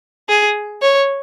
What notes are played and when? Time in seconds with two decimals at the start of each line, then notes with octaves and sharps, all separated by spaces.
0.29 G#4
0.81 C#5